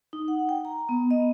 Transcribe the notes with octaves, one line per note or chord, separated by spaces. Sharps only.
D#4
F#5
G5
A#5
B3
D#5